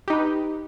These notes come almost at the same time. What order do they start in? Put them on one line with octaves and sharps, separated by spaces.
G4 D#4 B4